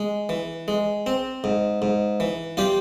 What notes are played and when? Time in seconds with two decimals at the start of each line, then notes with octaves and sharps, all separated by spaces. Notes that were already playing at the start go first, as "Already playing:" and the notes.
Already playing: G#3
0.29 E3
0.68 G#3
1.06 C4
1.44 G#2
1.82 G#2
2.20 E3
2.57 G3 F4 G4